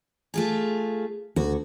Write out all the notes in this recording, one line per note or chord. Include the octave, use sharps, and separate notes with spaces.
A3 F4 G#4
D2 F#4